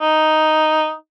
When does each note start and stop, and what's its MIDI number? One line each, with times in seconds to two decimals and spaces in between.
0.01 0.94 63